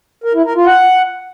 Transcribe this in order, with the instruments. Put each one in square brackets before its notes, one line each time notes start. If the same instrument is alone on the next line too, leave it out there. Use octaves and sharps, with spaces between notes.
[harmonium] A#4
E4
A#4
F4
F#5